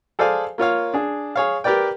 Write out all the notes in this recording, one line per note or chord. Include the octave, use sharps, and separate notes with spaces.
G#4 A4 C5 D5 F5 G#5
A#3 F4 C#5 F5
D4 G#4
G#4 C#5 F5
G4 A#4 B4 D5 G5